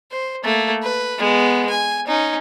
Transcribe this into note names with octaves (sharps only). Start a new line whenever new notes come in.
C5
A3 A#3
B4
G#3 B3
G#5
C#4 D#4